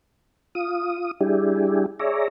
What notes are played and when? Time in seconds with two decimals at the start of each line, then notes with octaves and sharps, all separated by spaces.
0.55 F4 D#6
1.20 G3 D4 E4 G4 G#4
2.00 G#4 C#5 D5 E5 A#5